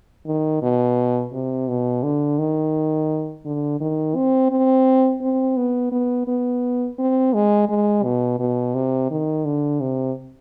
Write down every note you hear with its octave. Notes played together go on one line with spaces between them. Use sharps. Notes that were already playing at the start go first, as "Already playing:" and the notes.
D#3
B2
C3
B2
D3
D#3
D3
D#3
C4
C4
C4
B3
B3
B3
C4
G#3
G#3
B2
B2
C3
D#3
D3
C3